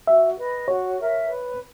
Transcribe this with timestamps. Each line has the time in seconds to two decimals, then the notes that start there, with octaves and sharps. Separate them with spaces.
0.07 F#4 E5
0.38 B4 D#5
0.68 F#4 C#5
0.99 A#4 E5
1.28 B4